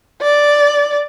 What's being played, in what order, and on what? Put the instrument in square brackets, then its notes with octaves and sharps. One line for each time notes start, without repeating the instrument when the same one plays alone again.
[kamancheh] D5